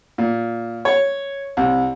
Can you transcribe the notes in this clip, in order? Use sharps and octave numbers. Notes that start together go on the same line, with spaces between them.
A#2
C#5
C2